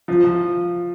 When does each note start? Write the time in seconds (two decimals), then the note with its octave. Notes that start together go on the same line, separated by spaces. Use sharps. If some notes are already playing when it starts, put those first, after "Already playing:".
0.08 F3
0.24 F3